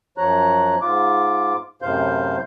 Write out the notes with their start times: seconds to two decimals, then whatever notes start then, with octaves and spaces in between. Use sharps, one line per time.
0.18 F#2 F3 C#5 A#5 F#6
0.82 G#2 F4 D6
1.82 F#2 A2 C3 C5 F5 G6